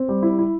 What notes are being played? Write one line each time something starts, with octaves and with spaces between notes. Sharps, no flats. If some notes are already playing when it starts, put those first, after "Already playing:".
Already playing: C4
G3
E4
E4